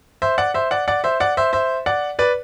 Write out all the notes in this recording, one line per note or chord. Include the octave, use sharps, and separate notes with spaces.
C5 E5
D5 F#5
C5 E5
D5 F#5
D5 F#5
C5 E5
D5 F#5
C5 E5
C5 E5
D5 F#5
B4 D5